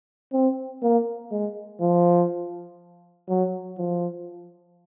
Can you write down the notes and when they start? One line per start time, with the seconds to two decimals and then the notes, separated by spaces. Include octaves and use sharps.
0.32 C4
0.83 A#3
1.32 G#3
1.81 F3
3.29 F#3
3.78 F3